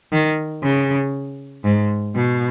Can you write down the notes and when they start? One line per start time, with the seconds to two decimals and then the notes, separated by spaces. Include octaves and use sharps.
0.13 D#3
0.63 C#3
1.65 G#2
2.15 B2